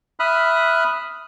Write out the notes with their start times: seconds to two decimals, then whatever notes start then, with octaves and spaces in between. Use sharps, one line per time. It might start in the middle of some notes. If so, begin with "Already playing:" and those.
0.20 E5 B5 D#6 F6 F#6